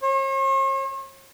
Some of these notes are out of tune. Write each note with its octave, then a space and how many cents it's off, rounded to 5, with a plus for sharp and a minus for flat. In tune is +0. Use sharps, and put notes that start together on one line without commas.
C#5 -45